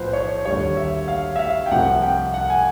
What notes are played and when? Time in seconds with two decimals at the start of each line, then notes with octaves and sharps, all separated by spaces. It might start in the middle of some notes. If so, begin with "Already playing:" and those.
Already playing: B1 A2 F3 B4 C5
0.13 C#5
0.45 D#2 D3 G3 C#5
0.77 E5
1.08 F5
1.36 E5
1.39 F5
1.66 G5
1.71 C2 C3 F3 F#5
2.02 G5
2.34 F#5
2.50 G#5